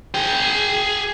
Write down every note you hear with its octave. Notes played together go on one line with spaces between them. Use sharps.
G#4 G5